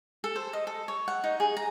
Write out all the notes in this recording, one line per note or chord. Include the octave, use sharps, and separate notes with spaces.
A4
C5
D#5
A4
C#5
F#5
D#4
G#4
A#5